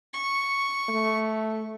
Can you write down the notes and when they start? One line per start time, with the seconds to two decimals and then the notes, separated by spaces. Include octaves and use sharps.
0.13 C#6
0.89 A3